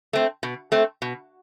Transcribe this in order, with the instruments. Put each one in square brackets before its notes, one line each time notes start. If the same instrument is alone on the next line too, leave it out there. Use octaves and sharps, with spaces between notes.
[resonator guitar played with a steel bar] A3 C4
B2
A3 C4
B2